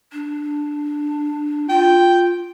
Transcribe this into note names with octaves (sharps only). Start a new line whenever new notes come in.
D4
F4 G5